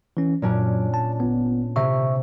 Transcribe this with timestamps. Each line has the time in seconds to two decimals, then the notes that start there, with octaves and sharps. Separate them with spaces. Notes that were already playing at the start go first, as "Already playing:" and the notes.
0.17 E3 C#4
0.42 F#2 A#2 F#3 C#4 D4
0.94 A5
1.20 G1 B3
1.76 C3 E5 C#6